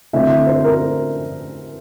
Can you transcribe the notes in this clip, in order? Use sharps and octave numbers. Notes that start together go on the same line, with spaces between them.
D3 A3 C4 E4 E5
C5
A#4